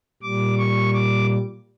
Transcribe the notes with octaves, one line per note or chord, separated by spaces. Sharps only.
A#2 G3 D6
C#6
D6